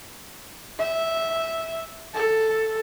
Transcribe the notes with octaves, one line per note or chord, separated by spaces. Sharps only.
E5
A4